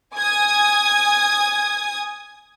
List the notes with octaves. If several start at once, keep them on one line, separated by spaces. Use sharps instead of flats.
G#5 D#6 G#6